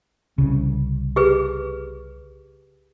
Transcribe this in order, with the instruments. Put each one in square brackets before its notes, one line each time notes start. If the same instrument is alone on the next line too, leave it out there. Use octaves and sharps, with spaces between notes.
[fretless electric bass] C2 C#3
[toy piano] G4 G#4 B4